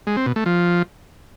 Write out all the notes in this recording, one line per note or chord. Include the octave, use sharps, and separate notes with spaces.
G#3
C4
B2
A3
F3